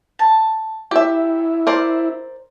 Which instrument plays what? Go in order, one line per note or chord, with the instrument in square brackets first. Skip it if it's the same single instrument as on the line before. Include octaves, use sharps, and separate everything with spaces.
[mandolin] A5
[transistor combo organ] E4 [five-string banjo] G4 E5
[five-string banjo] A#4 C5 D5